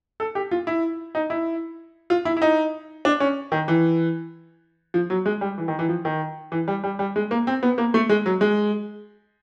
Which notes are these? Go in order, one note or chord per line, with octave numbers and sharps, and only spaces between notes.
A4
G4
F4
E4
D#4
E4
F4
E4
E4
D#4
D4
C#4
D#3
E3
F3
F#3
G#3
G3
E3
D#3
E3
F3
D#3
E3
G3
G3
G3
G#3
A#3
C4
B3
A#3
A3
G#3
F#3
G#3